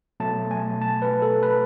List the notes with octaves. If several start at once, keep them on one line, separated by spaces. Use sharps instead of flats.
B2 F#3 A3 A5
G#5
A5
B4
A4
B4